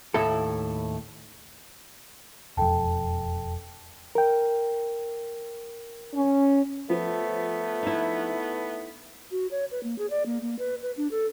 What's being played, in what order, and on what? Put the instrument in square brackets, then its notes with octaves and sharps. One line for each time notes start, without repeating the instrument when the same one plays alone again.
[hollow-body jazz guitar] D#2 A2 E4 A4
[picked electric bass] E1 F2 [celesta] A4 G5 A5
[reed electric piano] A#4 G5
[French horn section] C#4
[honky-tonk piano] F3 [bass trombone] A3 [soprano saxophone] B3
[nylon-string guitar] D#4 E4
[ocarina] F#4
C#5
B4
A#3
G#4
D5
A#3
A#3
B4
B4
D4
A4